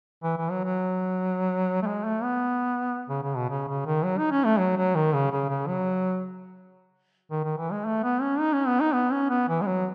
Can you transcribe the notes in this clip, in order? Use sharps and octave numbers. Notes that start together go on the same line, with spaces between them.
E3
E3
F#3
F#3
A3
G#3
A3
B3
C#3
C#3
B2
C#3
C#3
D#3
F#3
D#4
C#4
A3
F#3
F#3
D#3
C#3
C#3
C#3
F#3
D#3
D#3
E3
G#3
A3
B3
C#4
D#4
C#4
B3
D#4
B3
C#4
B3
E3
G#3
F#3